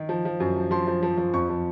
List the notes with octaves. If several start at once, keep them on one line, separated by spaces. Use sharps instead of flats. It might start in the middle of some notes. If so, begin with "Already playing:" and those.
Already playing: D#3
F3
F3
F#2
F3
F3 C6
F3
F3
F3
F2 C#6
F3